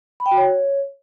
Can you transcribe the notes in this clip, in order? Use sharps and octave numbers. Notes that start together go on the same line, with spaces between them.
B5
G5
F#4
C#5